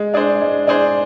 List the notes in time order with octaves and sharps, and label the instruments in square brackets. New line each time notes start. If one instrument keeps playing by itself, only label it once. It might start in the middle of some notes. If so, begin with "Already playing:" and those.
Already playing: [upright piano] G#3
D4 G#4 C5
G#3
D4 G#4 C5